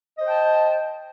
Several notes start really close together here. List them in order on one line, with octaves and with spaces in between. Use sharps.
D#5 C5 G5 A5